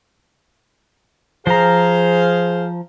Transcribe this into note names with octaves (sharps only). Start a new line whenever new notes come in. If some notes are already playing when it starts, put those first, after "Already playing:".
F3 G#4 C5 F5 A#5